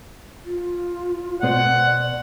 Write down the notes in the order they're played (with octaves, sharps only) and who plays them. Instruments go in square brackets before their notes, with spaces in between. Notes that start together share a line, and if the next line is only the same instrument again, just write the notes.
[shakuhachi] F4
[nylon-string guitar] B2 B3 C5 [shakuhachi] D5 [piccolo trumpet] F#5